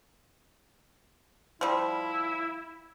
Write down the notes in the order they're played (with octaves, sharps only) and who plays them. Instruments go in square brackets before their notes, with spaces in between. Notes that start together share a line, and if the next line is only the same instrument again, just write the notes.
[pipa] F3 G3 [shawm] E4